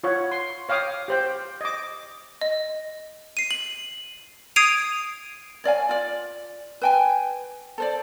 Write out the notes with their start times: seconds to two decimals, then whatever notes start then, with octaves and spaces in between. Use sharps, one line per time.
0.04 F4 C#5 F#5
0.31 C6
0.69 C#5 F5 G5 D6 D#6
1.08 G4 C5 G5
1.61 D#5 D6
2.41 D#5
3.37 C7 D#7
3.51 F#7
4.56 D#6 G#6 C7 D7 D#7 F7
5.64 C#5 D5 F5 G#5
5.89 F4 D5
6.81 B4 G5 G#5
7.78 A4 C5 D5